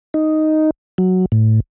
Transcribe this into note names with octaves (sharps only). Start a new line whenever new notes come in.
D#4
F#3
A2